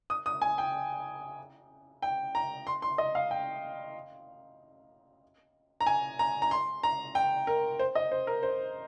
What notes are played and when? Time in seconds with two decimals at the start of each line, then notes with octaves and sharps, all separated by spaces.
0.10 D#6
0.26 D#6
0.42 G#5
0.58 G5
2.02 G5
2.35 A#5
2.67 C6
2.82 C6
2.98 D#5
3.15 F5
3.31 G5
5.81 A#5
5.87 G#5
6.19 A#5
6.42 A#5
6.51 C6
6.83 A#5
7.15 G5
7.47 A#4
7.79 C5
7.95 D#5
8.12 C5
8.27 A#4
8.43 C5